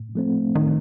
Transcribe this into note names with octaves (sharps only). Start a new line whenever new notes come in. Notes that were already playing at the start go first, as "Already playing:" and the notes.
Already playing: A2
F3 A3 C4
A2 D#3